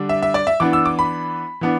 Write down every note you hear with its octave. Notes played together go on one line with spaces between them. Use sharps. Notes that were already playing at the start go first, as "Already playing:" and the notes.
Already playing: D3 G3 D4
E5
E5
D5
E5
E3 B3 D4 D6
E6
D6
B5
E3 B3 D4